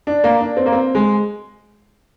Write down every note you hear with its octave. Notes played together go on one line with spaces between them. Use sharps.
D4
A#3
D4
C4
A#3
C4
G#3